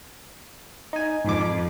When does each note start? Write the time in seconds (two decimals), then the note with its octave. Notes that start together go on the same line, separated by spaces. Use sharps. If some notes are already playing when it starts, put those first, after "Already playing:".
0.93 D#4 G#5
1.25 F2 G#2 D6